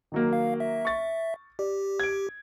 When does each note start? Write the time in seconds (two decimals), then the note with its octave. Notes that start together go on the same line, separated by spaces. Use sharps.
0.12 D#3 F#3 A#3
0.33 F5
0.60 E5
0.85 C#6 A6
1.59 G4 D5
2.00 G#6 D7